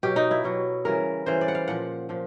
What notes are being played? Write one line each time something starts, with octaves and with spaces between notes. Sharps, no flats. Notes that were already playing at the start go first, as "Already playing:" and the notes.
B2 F#3 G4
D#4
E4
B2 F#3
C#3 E3 G3 A#4
C#3 E3 G3 C5
D5
F#5
F5
A#2 F3 F#5
A#2 F3